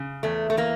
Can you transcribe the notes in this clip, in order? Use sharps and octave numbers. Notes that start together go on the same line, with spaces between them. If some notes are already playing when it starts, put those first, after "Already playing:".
Already playing: C#3
E2 A3
A3
E3 A#3